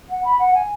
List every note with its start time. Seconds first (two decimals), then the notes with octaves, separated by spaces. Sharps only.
0.09 F#5
0.24 B5
0.40 F#5
0.55 G#5